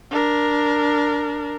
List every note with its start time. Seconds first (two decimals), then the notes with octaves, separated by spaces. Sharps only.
0.11 D4 A#4